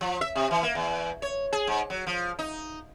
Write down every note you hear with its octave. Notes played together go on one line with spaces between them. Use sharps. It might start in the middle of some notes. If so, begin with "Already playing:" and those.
F3
E5
C3
E3
A#3
E2
C#5
G#4
G#2
F#3
F3
D#4